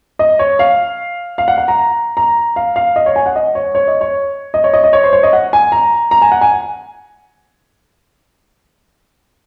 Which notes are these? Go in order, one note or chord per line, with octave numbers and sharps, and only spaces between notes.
D#5
C#5
F5
F5
F#5
F#5
A#5
A#5
F5
F5
D#5
C#5
G#5
F#5
D#5
C#5
C#5
D#5
C#5
D#5
C#5
D#5
D#5
C#5
C5
C#5
D#5
F#5
G#5
A#5
A#5
G#5
F#5
G#5